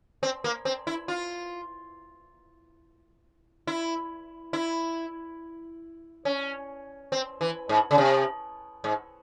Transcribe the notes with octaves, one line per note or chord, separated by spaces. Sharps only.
C4
A#3
C4
E4
F4
E4
E4
C#4
C4
E3
G#2
C#3
C3
G#2